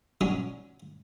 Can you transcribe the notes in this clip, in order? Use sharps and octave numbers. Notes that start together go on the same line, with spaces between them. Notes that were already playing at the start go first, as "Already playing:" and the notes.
F#3 C#4 D4